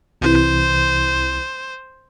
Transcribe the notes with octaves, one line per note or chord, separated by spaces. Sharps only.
C2 C3 E3 C5